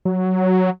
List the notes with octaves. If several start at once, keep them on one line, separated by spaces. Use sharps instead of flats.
F#3